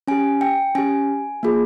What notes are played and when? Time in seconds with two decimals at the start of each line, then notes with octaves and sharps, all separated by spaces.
0.08 C#4 G4 G#5
0.41 G5
0.75 C#4 G4 G#5
1.43 A#3 F4 G#4